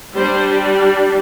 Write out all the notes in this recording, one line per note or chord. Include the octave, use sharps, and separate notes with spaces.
G3 D4 C5